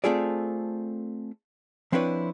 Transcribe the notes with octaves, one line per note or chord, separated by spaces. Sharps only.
A3 C4 F4 G#4 A4 D5
F3 C4 D4 E4 B4 C#5